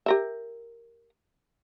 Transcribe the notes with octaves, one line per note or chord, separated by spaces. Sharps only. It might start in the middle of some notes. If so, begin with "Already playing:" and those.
G4 A#4 E5